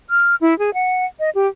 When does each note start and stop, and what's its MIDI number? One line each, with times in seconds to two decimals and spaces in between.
0.10 0.35 89
0.41 0.57 64
0.59 0.74 68
0.74 1.05 78
1.20 1.30 75
1.35 1.47 67